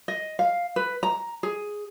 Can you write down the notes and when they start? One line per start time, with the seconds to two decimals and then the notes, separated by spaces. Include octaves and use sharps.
0.08 D#5
0.39 F5
0.76 B4
1.03 A#5
1.43 G#4